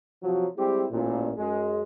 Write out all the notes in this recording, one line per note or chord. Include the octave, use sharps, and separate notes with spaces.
C3 F3 F#3
G3 G#3 C4 E4 G4
A1 A#2
F#2 G#3